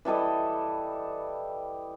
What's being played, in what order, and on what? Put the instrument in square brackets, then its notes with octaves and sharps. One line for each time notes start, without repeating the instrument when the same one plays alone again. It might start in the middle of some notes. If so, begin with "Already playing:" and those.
[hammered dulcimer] E3 G3 A4 D#5